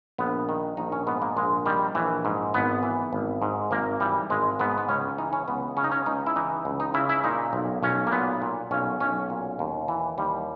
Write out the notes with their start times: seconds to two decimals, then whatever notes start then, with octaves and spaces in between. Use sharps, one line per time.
0.18 A#1 B3
0.49 D#3
0.77 A#1 D#4
0.92 C#4
1.07 G#2 B3
1.22 A#3
1.37 A#1 G#3
1.66 D#3 G3
1.95 A#1 E3
2.25 G#2
2.54 G#1 B3
2.83 E3
3.13 G#1
3.42 G#2
3.71 G#1 A#3
4.00 E3 G3
4.30 G#1 G#3
4.60 G#2 B3
4.77 B3
4.89 C#2 C#4
5.18 E3 D#4
5.33 C#4
5.48 C#2 B3
5.77 C#3 C#4
5.84 D#4
5.92 C#4
6.06 C#2 D#4
6.26 E4
6.36 E3 D#4
6.65 C#2
6.80 D#4
6.94 C#3 E4
7.09 E4
7.24 A#2 D#4
7.53 B1
7.83 B1 C#4
8.07 A#3
8.12 A#2 B3
8.42 A#2
8.71 B1 C#4
9.00 B1 C#4
9.30 A#2
9.59 D#2
9.88 E3
10.18 D#2 G3